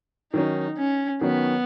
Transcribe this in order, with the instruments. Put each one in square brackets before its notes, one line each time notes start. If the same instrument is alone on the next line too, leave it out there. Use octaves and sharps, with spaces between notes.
[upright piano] D#3 F#3 C#4 [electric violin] D#4
[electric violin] C#4
[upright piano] D#3 F#3 C#4 [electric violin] B3